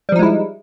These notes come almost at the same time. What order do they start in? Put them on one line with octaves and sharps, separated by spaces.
G3 F3 D#4 G#3 E4